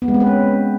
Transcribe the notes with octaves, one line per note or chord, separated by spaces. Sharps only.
B3
G#3
C4
B4
C#4